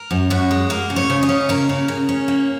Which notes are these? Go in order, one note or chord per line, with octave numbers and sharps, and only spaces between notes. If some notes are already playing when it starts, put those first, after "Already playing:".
Already playing: A#4
F#2
F#2 F#4
G#3
A#3 A#4
C#3
C#5
C#3
D#5
C#4
A#3 A#4
C#3
C#3
C#4
A#3